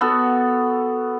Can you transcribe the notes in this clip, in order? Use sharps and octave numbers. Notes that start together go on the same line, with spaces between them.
B3 F#4 A4